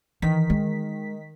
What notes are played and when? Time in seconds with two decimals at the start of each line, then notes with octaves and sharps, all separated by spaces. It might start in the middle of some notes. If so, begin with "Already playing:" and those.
0.22 D#3 E3 B6
0.50 G#3